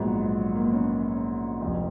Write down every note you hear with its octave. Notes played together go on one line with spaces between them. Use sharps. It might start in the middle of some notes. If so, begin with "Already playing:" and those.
Already playing: A#1 G#2 F#3 B3
A#3
B3
C#4
F1 F2 F3